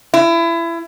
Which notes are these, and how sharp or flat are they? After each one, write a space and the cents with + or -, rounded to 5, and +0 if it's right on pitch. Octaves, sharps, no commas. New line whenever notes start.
E4 +25